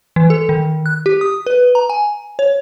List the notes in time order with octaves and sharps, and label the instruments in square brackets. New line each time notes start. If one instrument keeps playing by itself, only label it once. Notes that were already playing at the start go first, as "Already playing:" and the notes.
[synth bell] E3
A4
D#3
F#6
G4
D#6
B4
A#5
G#5
C#5